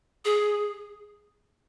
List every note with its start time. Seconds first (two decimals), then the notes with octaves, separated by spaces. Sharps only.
0.25 G#4